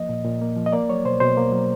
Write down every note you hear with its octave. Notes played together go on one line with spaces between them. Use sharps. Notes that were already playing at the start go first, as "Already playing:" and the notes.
Already playing: F3 A#3 D#5
A#2
A#2
A#3
F3
D#5
A#3 D5
F#3 C#5
B2 C5
B2 C5
A#3
F#3